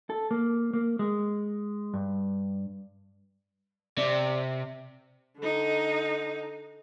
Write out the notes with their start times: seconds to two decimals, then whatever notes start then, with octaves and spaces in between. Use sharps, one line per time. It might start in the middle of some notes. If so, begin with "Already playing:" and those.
0.10 A4
0.31 A#3
0.74 A#3
0.99 G#3
1.94 G2
3.98 C3 D5
5.38 D3 D#4